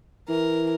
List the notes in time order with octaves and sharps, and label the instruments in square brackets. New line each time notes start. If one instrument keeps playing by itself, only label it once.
[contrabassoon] E3 [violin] A#4